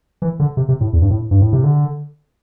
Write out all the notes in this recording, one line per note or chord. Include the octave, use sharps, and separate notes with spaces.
E3
D3
C3
C3
A2
E2
G2
A2
G2
A2
C3
D3